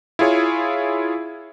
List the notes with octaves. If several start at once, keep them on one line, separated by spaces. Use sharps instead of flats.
E4 F4 G#4 C#5